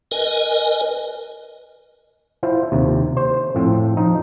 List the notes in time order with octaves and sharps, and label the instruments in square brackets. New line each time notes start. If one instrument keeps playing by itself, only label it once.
[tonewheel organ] A#4 B4 D#5 G#5
[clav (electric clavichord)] E4 F4 C5
D#2 C3
C5
F2 A2 F3 C4
F3 D#4